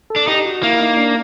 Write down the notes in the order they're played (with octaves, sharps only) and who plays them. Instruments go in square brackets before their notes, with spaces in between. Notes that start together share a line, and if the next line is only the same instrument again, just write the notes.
[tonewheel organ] A4
[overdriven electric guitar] D4
[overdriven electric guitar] D#4 [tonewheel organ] G4
[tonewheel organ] F#4
[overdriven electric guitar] A#3 [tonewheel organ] E4
[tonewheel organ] D#4
D4